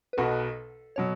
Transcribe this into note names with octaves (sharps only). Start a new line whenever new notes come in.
B4
B1 B2 B3 F#4 A4
B2 F#3 C#5